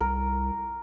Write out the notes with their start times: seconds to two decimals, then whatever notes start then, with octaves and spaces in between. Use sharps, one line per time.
0.01 C2 A#4